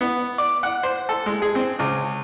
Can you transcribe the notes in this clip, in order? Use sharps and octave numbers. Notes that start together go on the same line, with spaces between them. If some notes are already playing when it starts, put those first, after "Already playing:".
B3
D5
F#5
C5
A4
G#3
G#4
C4
C#2